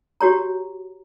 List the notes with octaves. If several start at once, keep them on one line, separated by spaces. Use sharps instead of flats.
F#4 G4 C#5 A#5